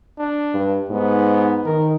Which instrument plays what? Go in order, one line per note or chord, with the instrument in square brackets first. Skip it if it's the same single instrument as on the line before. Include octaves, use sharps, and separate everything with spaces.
[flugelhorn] D4
[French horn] G2
[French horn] G#2 [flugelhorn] B3
[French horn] D#3 [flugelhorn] A#4